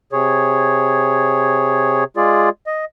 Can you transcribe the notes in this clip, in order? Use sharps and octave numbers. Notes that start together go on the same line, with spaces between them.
C3 G#4 C#5
G#3 F4 G#4 D5
D#5